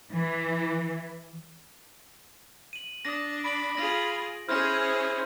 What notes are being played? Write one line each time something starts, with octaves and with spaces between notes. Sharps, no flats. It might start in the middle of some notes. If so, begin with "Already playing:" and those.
E3
D#7 F#7
D4 D#6 A#6
B5 D7 F#7
F4 G#4 A#6
C#4 E4 G#4 C5 F6 A#6